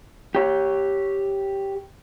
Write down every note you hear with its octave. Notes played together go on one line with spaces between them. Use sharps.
G4 C#5